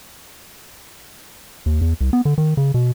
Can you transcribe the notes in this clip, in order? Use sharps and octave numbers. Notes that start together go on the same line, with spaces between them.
D#2
E2
C2
B3
D3
D#3
C#3
B2